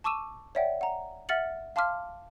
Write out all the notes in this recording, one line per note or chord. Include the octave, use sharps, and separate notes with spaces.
A5 C#6 D6 E6 D#7 E7
C#5 D5 E5 F#5 G5
F#5 A#5
E5 F#5 F6 A6 C#7 F#7
F5 A5 C6 D6 F6 B6